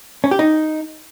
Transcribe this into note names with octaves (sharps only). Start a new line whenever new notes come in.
C#4
G4
D#4